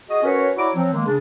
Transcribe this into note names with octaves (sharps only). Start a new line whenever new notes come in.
F#4 G#4 D#5
C#4 F#4 A#4 B4 C#5
E4 F#4 C#5 D5 A#5 D6
F3 F#3 C4
D#3 G#3 A#3
C#3 D4